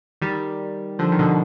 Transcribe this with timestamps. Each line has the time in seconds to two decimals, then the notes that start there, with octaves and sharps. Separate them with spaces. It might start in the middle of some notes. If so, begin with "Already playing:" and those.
0.22 D#3 G3
0.99 D3 F3
1.12 D#3
1.19 B2 D3